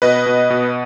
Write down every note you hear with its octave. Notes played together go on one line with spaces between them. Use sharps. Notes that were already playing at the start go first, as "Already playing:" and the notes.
B2 B4 D#5
B2
B2